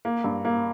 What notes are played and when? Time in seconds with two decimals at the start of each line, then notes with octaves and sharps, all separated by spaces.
0.05 A#3
0.24 G2
0.45 A#3